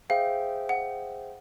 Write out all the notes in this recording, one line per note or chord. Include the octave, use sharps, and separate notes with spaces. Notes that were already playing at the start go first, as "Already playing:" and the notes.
G#4 C5 E5 F5 G5
F#5